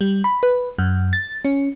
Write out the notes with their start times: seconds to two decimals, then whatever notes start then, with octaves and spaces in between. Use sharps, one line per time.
0.01 G3
0.24 B5
0.43 B4
0.78 F#2
1.13 A6
1.45 C#4